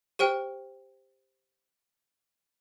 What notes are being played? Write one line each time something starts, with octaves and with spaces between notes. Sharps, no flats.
G4 C5 G5 F6